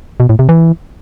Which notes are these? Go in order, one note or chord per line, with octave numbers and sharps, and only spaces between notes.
B2
A2
C3
E3